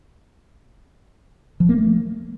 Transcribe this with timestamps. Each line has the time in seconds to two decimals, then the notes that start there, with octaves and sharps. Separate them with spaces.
1.60 F3
1.69 A#3
1.78 A3